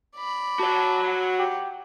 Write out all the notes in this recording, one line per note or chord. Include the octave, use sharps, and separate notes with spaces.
D5 B5
F#4 C#5 A5
F#5
G4